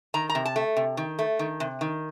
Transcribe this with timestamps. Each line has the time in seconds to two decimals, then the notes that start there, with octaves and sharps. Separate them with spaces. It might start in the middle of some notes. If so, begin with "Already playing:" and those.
0.14 D#3 A#5
0.29 A#5
0.35 C3
0.45 A5
0.56 A3
0.77 C3
0.97 D#3
1.19 A3
1.39 D#3
1.60 C3
1.81 D#3